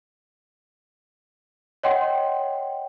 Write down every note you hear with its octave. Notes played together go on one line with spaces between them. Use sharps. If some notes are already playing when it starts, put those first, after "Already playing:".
C#5 D#5 F#5 G5 C6